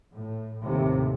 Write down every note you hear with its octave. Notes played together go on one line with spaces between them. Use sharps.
A2
D#2 A2 C3